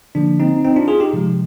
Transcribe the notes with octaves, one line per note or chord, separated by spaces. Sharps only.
D3 F3 A#3 D4
C4 D#4
C4 D#4
D4 F4
F4 G#4
D#4 G4
C3 F3 G#3